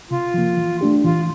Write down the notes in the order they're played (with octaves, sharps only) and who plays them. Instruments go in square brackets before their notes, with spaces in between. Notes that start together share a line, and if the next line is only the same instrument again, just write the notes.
[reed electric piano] C3 [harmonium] F4
[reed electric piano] F3 A#3
E3
A3 D4 G4
[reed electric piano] E3 [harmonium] F4